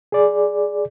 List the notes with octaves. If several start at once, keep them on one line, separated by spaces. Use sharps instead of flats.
G#4 D5